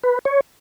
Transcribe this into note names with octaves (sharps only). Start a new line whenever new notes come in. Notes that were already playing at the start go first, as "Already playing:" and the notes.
B4
C#5